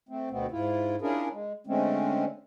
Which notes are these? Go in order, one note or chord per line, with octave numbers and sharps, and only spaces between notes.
A3 C4
D2 B2 A3 B3 C4
G#2 E4 F4
C#4 D4 E4 F4 G#4 A#4
G#3
D3 G#3 A3 C4 C#4